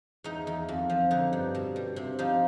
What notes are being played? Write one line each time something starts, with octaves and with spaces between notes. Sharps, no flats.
E2 D#4
E2
F2
F3
D3 D#4
G2
B2
G3
C3
F3 D#4